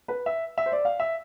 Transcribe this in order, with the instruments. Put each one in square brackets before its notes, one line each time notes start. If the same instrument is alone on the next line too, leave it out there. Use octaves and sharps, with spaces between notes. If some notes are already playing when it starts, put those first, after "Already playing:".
[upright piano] B4
E5
E5
C5
D5
F5
E5